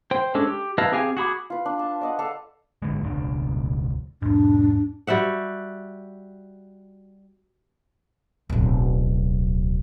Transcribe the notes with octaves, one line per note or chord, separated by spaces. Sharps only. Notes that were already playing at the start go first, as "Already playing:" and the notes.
C5 G5 C6
G#3 C#4 D4 A4
G4
E4 B4 D#5 F5 A5
C4 G4 G#4 F5 G#5
F#4 G#4 B5 D6
F4 B4
D4
A5
D5 D#5 F#5
A4 D5 F5
G#1 D3 G#3
E1 C#2 D4
E2 G#2 D4
G3 F#4 E5 F#5
D1 B1